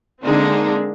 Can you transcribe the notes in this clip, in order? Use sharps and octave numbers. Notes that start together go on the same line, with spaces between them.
D3 G#3 A#3 C4 D4 D#4